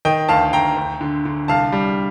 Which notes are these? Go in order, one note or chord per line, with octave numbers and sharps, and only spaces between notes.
D#3 D#5 G5
D2 F5 A5
D2 G5 A#5
D2
D3
D3
C2 F5 A5
G3